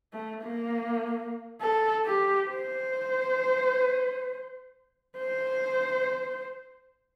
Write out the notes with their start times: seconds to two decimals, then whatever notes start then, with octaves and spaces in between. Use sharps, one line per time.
0.13 A3
0.43 A#3
1.61 A4
2.06 G4
2.50 C5
5.17 C5